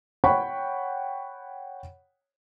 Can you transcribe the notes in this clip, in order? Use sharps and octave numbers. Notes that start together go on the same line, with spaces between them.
C#5 F#5 G5 B5 C#6